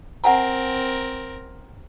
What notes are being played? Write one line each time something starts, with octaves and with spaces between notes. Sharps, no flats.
C4 A#4 F#5 G#5 A#5